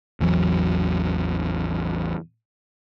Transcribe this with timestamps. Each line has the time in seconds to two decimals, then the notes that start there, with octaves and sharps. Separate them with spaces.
0.20 A1 E2 E3 F#3